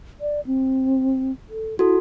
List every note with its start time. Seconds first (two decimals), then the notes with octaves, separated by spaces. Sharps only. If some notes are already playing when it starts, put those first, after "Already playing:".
0.21 D5
0.46 C4
1.50 A4
1.79 E4 F#4 A4